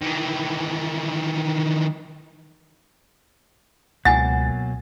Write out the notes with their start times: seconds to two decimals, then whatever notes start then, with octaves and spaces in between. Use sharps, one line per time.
0.01 D#3 E3
4.05 C#2 B2 F#3 A#3 F#5 G#5 A6